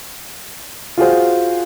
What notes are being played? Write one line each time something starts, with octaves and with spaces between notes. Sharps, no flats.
F4 F#4 G#4 C5